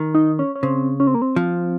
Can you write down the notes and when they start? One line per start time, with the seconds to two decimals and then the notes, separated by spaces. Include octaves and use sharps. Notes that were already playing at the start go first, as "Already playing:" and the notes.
Already playing: D#3
0.15 D#4
0.39 C#4
0.56 C#4
0.63 C#3 C4
1.00 C#4
1.07 C4
1.15 A#3
1.22 C4
1.36 F3